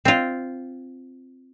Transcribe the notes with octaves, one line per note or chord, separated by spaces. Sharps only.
C4 F4